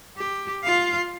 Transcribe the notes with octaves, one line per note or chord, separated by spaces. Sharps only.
G4
F4 F5